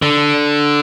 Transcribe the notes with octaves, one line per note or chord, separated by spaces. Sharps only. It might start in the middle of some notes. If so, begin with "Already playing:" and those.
D3